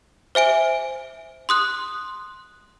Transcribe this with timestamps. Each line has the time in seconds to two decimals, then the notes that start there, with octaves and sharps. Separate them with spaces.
0.35 C5 E5 G#5 D7
1.49 C6 D#6 F#6